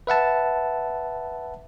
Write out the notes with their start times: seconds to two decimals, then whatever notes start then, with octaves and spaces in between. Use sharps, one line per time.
0.07 B4 E5 F#5 A5